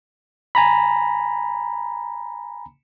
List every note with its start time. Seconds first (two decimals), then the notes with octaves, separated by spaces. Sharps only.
0.55 G#5 A#5 B5